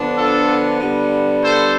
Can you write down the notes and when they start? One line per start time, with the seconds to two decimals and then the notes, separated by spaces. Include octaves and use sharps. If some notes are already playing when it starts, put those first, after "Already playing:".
Already playing: D3 F3 B3 D4
0.17 F4 A4
0.80 D3 G3 B3
1.43 A4 C5